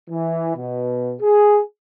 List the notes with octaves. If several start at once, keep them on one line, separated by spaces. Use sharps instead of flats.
E3
B2
G#4